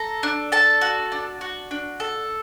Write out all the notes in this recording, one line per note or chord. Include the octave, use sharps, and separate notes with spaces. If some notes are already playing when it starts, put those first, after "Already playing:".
Already playing: A4 A#5
D4
A4 A5
F#4
D4
F#4
D4
A4